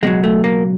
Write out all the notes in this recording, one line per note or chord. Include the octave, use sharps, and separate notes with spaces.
C#2 B2 F#3 G#3
A3
A#3